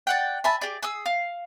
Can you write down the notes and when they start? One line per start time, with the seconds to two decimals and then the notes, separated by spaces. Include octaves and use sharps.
0.07 D5 F#5 G5
0.44 E5 G#5 A5 B5
0.61 G4 G#4 D5
0.83 G#4 D#6 E6
1.06 F5